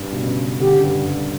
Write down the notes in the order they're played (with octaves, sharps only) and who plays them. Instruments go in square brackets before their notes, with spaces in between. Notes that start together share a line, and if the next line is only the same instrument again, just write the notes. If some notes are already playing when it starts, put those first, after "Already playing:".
Already playing: [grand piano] G2
B2
C#3
[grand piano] D3 [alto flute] G4
[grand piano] C#3
G2
G2